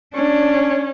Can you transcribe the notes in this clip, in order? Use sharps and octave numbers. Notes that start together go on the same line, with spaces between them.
C#4 D4